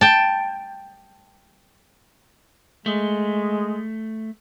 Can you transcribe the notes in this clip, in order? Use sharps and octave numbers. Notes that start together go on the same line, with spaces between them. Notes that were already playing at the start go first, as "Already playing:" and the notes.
G5 A5
G#3 A3